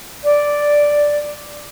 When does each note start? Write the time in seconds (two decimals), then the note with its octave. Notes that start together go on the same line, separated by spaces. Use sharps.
0.24 D5